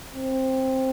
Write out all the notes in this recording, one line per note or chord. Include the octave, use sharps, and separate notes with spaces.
C4